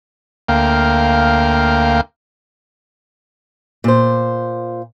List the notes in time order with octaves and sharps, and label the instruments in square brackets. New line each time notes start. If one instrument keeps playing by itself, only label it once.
[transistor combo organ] D2 A#3 F5 G5
[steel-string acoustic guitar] A#2 C5